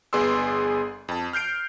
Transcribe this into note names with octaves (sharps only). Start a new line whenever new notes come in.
G1 B3 G#4 D5 C6 E6
F2 A5
F6 G6 C7 D7